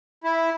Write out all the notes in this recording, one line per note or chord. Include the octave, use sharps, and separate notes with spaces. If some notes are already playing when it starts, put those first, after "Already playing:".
E4